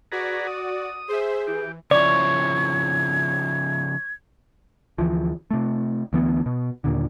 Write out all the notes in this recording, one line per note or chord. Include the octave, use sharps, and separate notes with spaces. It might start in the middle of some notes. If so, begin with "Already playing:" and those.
F#4 G#4 B4 D5 A#5
D#6
G#4 C5 E5
E3 G4
C#3 F3 E4 C#5 D5 G#6
D2 E3 F3
C3 A3
D2 E3 B3
B2
D#2 A#2 D3